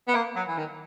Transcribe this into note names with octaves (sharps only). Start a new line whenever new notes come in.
B3
A#3
F#3
E3
D#3